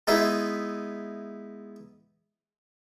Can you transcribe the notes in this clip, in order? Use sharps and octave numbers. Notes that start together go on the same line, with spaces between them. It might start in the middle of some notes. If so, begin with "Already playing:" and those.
G#3 B3 D#4 E4 G#4 E5